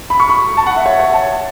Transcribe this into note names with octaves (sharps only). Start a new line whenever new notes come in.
B5
C#6
B5
A5
F#5
E5
C#5
C#5
A5